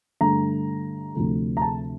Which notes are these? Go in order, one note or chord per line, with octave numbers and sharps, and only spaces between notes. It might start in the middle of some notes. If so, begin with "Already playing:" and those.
G2 D3 A3 A#5
D2 C3 F3 A3
A#5
A5